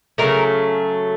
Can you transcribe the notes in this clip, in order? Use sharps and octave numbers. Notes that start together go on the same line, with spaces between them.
C#3 F#3 A3 A#4